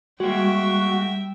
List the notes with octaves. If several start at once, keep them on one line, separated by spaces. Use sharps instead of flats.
G3 G#3 A#3 F#4 E5 G5